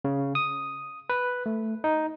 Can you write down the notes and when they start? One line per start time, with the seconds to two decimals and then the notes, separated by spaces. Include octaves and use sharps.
0.05 C#3
0.35 D#6
1.10 B4
1.46 A3
1.84 D#4